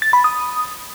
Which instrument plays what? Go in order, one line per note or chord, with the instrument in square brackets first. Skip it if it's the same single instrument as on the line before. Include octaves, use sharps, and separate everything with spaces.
[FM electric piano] A6
B5
D#6